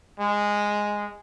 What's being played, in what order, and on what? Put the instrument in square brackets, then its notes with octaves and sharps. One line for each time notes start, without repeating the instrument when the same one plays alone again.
[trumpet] G#3